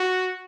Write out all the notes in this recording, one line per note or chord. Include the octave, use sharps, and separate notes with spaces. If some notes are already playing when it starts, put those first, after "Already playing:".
Already playing: F#4